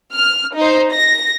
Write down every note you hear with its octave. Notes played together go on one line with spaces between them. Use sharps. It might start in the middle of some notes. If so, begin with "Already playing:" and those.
F6
D#4 C5
A#6